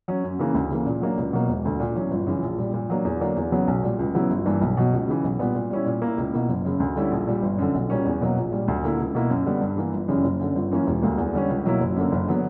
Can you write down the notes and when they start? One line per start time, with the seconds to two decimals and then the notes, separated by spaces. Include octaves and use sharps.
0.08 F#3 C#4
0.24 F#2
0.39 C#3 E3 A#3
0.54 D2
0.70 C#3 E3 A#3
0.86 A#2
1.02 F#3 A#3 D4
1.17 C#2
1.33 B2 F#3 A#3
1.49 E1
1.65 D2 D3
1.80 A#2
1.95 F#3 C#4 E4
2.11 G1
2.27 F#2 C#3 E3
2.42 A#1
2.58 A#2 G3
2.74 A#2
2.90 F#3 A#3 D4
3.05 E2
3.21 D3 F#3 A#3 D4
3.36 E2
3.52 C#3 F#3 B3
3.68 B1
3.83 A#2 G3
3.99 C#2
4.14 C#3 F#3 B3 E4
4.30 G1
4.46 G2 E3 G3 A#3
4.61 B1
4.77 B2 F#3
4.93 C#2
5.08 C#3 E3
5.24 B1
5.39 A#2 G3 B3
5.55 A#2
5.71 G3 C#4 E4
5.86 A#2
6.02 A#3 E4
6.17 C#2
6.33 B2 A#3 E4
6.49 F#1
6.65 F#2 C#3
6.80 D2
6.96 D3 G3 C#4 E4
7.12 A#1
7.27 A#2 G3
7.43 G1
7.58 F#2 D3
7.74 B1
7.90 A#2 G3 A#3 C#4
8.05 E2
8.21 B2 F#3 A#3
8.36 A#1
8.52 A#2 G3
8.68 D2
8.83 D3 A#3 E4
8.99 C#2
9.15 B2 A#3 E4
9.30 F#2
9.46 D3 G3 B3
9.61 G2
9.77 E3 A#3
9.93 G1
10.08 F#2 C#3 E3 G3
10.24 F#1
10.39 F#2 D3
10.55 G1
10.71 F#2 E3 A#3 C#4
10.87 E1
11.03 D2 D3 G3 A#3
11.18 E2
11.33 D3 G3 C#4
11.49 C#2
11.65 B2 F#3 A#3 E4
11.80 F#1
11.96 F#2 D3 A#3
12.12 F#1
12.27 D3 F#3 B3